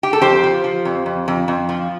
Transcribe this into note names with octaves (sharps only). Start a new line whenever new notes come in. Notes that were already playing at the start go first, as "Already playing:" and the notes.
G4
A4
F2 G4 C5
F3
F3
F2
F2
F2
F2
F3